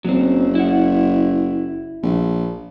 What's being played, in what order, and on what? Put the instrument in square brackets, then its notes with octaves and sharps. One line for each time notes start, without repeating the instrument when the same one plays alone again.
[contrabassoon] F#1 [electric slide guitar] F#3 C4
[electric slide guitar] E4 F#5
[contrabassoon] A#1